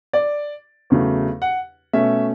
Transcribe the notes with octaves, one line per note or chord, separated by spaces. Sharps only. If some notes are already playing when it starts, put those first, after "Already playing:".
D5
E2 C#3 F#3 A3
F#5
B2 A3 C#4 E5